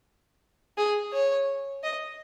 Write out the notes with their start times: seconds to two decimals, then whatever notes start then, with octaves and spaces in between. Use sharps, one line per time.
0.78 G#4
1.13 C#5
1.84 D#5